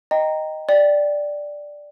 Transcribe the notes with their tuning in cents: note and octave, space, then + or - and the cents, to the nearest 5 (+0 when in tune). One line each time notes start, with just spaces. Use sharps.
D#5 +0 G5 +0 A#5 +0
D5 +0 G5 +0